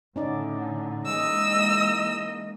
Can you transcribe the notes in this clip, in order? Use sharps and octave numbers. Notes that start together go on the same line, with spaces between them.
A2 D3 C#4 D#4 D5
E3 G#3 A#3 D#5 E6